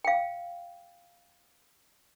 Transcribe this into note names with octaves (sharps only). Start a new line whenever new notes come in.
F5 G5